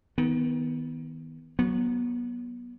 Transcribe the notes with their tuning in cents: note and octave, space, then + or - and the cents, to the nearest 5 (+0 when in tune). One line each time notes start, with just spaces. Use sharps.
D#3 +30 B3 +0
F#3 +0 B3 -30